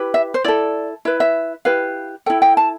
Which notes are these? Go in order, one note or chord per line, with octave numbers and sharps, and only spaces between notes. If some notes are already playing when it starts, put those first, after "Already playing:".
Already playing: E4 G4 B4
E5
C5
E4 A4 D5
E4 B4 E5
E5
E4 G4 B4 F5
E4 A4 G5
G5
A5